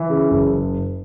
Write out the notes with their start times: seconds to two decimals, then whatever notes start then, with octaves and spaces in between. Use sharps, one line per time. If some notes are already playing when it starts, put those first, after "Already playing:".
Already playing: E3
0.10 C#3
0.31 F#1